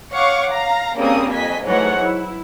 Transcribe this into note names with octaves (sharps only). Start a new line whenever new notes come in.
C#5 F5 F#5 C#6 D6
F5 A#5
C#3 G3 A#3 C4 A#4 D#6
F2 D#5 G#5 B6
G#2 E3 F#3 A3 C#5 F#5
E4